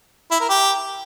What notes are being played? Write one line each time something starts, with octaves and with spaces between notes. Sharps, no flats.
E4
A#4
G4